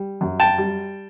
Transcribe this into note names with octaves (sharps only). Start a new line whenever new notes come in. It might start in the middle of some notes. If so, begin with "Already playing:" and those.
Already playing: G3
F#2
G5 A5
G3